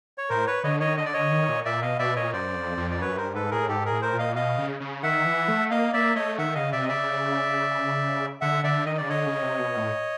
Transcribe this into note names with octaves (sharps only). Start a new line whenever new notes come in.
C#5
A2 A#4 C5
B4 C#5
D3 C#5 D#5
D#3 C#5 D#5
D3 D#5
D5
D3 C#5 D#5
D#3
A#2
A#2 D5 E5
B2 D#5 F5
B2 D5 E5
A#2 C#5 D#5
F#2 C5 D5
F2
F2
D5
F#2 B4 C#5
G2 A#4 C5
G#2 A4 B4
A2 G#4 A#4
G#2 G4 A4
G#4 A#4
A2
A#4 C5
A#2
D#5 F5
B2 D#5 F5
C#3
C#3
D#3 E5 F#5
E3
A3
A#3 D#5 F5
A#3 D5 E5
A3 C#5 D#5
D#3 E5 F#5
C#3 D#5 F5
C3 D5 E5
D#5
C#3 D5 E5
D3 E5 F#5
D3 D5 E5
D#3 D#5
C#3 D5
D3 C#5 D#5
C#3
C3
B2
A2